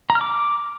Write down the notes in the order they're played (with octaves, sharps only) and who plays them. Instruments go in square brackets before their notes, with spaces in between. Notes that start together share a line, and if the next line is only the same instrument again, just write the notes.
[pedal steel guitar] A#5
F6
D6